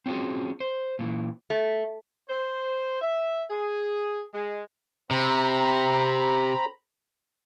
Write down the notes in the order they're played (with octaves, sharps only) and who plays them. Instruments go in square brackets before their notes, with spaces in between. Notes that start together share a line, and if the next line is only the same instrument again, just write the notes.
[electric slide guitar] C4 C#4 F4 F#4 G#4
C5
A#2 D#3 E3
[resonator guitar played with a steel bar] A3
[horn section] C5
E5
G#4
G#3
[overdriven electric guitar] C3 [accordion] C4 A#5 B5